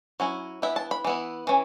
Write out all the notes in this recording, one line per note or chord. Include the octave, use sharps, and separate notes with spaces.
F#3 C#4 E4
E3 B3 E4 E5
A5
B5
E3 B3 E4
E3 C#4